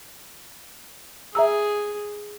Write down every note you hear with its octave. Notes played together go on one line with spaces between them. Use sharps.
G#4 E5 A#5 E6